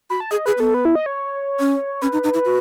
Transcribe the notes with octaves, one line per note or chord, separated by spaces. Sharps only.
F#4 B5
A5
G#4 D#5
G#4 B4
B3 A4
B4
E4
D#5
C#5
C#4
C#4 B4
D#4
D#4
E4
F#4